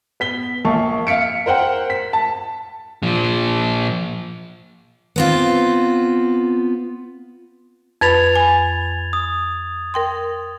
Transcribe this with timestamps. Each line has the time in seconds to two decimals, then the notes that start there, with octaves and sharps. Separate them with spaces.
0.20 B3 B6 G7
0.65 A#1 A#3 A5 C#6
1.07 E5 F5 B6 C#7 D7
1.46 A#4 C5 F#5 G5
1.90 B6
2.13 A5
3.03 A#2 F3
5.16 B3 C4 F4
8.01 F2 B4 B5 G#6 A6 F7
8.36 G#5 B5
9.13 D#6
9.94 A#4 G5 C6